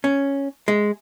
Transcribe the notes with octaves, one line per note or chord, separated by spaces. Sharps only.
C#4
G#3